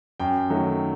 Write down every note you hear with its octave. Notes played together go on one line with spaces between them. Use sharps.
F#2 G5
D#3 F#3 A3